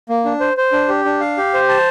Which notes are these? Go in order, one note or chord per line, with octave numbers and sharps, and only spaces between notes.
A#3
D4
C5
C5
D4
G4
D4
F5
G4
C5
A5